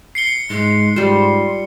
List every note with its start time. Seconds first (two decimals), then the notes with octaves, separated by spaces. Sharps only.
0.15 C7 C#7 G7
0.50 G#2 G#3
0.96 G#2 G3 F4 C5